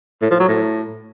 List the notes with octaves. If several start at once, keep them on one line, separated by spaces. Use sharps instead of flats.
A2
F3
F#3
A2